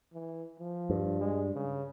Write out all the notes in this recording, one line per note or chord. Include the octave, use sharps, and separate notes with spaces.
E3
F3
G2
G#3
C#3